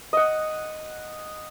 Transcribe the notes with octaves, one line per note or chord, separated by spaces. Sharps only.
D#5 F#5